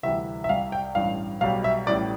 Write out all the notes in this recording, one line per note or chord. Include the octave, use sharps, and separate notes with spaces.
D2 C3 E3 G3 E5
E5
C2 C3 G3 F5
G5
A1 G2 E3 F5
B1 B2 G3 F5
E5
A1 A2 E3 G3 D5